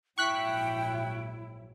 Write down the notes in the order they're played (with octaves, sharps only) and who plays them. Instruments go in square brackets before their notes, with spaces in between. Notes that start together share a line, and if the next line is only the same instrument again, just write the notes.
[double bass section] A#1 G#2 F#3 [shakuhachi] E4 [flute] G5 [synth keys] C#6 F#6 B6